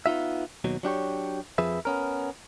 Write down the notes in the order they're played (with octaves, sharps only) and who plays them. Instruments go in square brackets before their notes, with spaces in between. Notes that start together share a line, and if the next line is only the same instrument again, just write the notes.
[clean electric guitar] B3 D#4 F4 E5
D#2 B2 F#3
F#3 D4 G4 C#5
F2 F3 G#4 B4 E5
B3 C#4 A#4